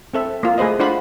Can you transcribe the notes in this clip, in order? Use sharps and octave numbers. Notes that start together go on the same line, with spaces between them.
C4 A4 E5
A#3 F4
A3 G#4 B4 C5 D#5
D4 F4 C5 F#5 B5